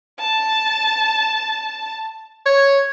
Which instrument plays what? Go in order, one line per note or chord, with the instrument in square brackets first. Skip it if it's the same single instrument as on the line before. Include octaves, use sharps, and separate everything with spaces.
[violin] A5
[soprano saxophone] C#5